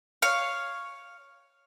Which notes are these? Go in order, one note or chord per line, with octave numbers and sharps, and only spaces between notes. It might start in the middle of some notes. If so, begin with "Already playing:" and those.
C#5 F5